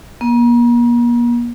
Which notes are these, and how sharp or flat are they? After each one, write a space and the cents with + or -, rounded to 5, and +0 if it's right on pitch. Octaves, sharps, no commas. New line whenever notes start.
A#3 +40